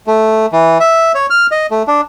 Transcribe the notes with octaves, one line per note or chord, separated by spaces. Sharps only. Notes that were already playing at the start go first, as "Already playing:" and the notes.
A3
E3
E5
C#5
F6
D#5
A3
D4